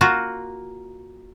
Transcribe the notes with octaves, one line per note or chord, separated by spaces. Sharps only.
A#3 F4 F#4